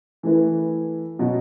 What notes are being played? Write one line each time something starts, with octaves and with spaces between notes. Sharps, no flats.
E3 A3 E4 B4
B2 F#3 B3